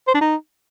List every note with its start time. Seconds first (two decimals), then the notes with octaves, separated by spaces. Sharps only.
0.08 C5
0.14 D4
0.21 D#4